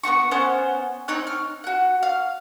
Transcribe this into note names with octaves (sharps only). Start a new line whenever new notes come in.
B3 D4 F#4 C#6
B3 C#4 C5 F#5
C4 D#4 C#5 F#6
F6
F#4 F#5
F5